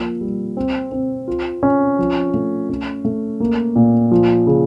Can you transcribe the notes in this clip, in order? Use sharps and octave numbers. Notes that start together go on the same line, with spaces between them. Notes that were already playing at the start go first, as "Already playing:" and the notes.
Already playing: F3 A#3
G3
C4
C4
F4
C#4
F3
A3
C#4
A3
A#3
A#2
F3
C#3